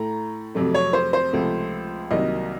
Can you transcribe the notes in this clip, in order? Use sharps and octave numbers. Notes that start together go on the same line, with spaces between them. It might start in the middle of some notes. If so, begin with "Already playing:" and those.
Already playing: A2 A3 A#5
F2 C3 F#3 A3
C#5
C5
C5
C#2 C3 F3 A3
C2 C3 D#3 F#3 A#3 D#5